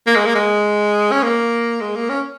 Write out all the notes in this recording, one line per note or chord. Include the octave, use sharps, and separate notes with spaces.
A#3
G#3
A#3
G#3
C#4
A#3
G#3
A#3
C#4